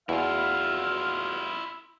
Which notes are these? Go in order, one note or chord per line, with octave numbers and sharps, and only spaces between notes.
E2 B2 E4 F4 F5